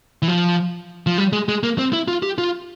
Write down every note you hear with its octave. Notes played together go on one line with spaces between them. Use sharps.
E3
F3
F3
G3
G#3
G#3
A#3
C4
E4
F4
G4
F4